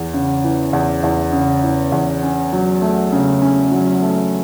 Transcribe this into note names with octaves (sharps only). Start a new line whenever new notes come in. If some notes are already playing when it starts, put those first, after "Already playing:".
Already playing: E2
C#3
E3
E2
E2
C#3
E3
E2
C#4
F#3
A3
C#3
C#4
F#3
A3